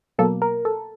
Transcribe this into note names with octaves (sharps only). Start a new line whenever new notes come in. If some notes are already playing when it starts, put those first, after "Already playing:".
B2 F#3 A#3 A4
A#4
A4